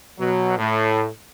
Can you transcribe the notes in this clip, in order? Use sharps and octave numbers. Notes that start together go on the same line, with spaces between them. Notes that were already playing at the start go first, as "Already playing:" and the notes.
B2 F#3
A2